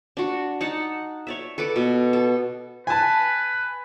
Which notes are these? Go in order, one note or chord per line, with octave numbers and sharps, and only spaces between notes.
D4 F#4
D#4 F#5 A5
C#5 D5 E5
A4 B4 F#5 D6
B2
A4
B4 G#5 A5